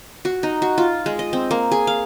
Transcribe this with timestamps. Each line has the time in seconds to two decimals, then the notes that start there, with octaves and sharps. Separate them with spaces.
0.25 F#4
0.43 D#4
0.62 F#4
0.78 F4
1.06 G#3
1.19 D#5
1.33 C4
1.51 A#3
1.72 G#4
1.87 F5